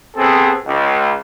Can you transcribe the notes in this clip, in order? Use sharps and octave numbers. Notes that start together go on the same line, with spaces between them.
C3 B3 C4 G#4 A4
C#2